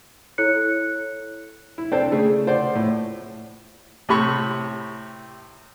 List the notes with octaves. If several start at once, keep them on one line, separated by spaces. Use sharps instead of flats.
E4 A4 C#5 F#6 C#7
E4
C4 D4 A4 C5 D5 A5
C#3 A3 G#4
F4 C5 D5 F#5
A2
A2 C3 G4 B5 C#6